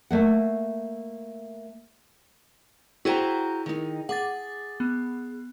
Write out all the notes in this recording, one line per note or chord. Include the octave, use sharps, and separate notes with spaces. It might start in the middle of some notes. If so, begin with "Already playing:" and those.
A3 A#3 F#5
E4 F#4 G#4 C5 G5 A#5
D#3 D#4
G#4 F#5 D6 A6
B3